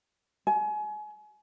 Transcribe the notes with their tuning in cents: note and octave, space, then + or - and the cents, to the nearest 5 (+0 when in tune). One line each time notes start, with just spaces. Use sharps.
G#5 +30